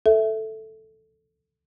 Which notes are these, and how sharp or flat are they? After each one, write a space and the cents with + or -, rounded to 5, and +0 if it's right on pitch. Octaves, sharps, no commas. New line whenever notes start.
A4 +0 E5 +0